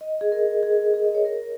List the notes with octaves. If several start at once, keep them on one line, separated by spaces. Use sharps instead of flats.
D#5
G#4
A#4
G#4
G#4
D#5
C#5
A#4